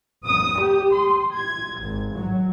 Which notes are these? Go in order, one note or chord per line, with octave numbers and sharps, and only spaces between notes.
D#6
G4
C6
G#6
G#1
F#3